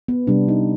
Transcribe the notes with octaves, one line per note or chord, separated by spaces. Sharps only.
B3
C3 G3 D4
D#4